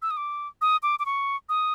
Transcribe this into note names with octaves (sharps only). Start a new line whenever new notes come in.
E6
D#6
D6
D#6
D6
D6
C#6
D#6